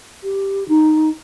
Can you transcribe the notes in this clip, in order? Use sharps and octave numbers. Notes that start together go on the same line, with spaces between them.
G4
D#4